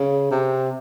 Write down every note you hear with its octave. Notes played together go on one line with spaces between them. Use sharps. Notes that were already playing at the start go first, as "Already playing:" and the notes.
Already playing: C#3
C3